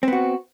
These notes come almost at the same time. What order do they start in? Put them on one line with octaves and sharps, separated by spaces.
C4 B3 F#4